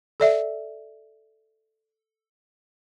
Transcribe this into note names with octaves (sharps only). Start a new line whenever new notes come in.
A4 D5 E5